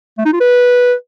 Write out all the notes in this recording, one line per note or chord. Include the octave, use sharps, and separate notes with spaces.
A3
D#4
F4
B4